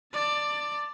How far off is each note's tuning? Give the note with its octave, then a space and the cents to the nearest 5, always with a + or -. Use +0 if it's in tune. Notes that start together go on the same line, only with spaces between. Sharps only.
D5 +10 A5 +30